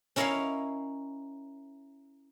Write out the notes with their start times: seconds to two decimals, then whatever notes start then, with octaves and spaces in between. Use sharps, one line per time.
0.16 C#4 E4 A#4 C#5 D#5 F5